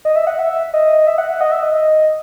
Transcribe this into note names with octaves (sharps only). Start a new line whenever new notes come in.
D#5
E5
F#5
E5
D#5
E5
F#5
F#5
D#5
E5
D#5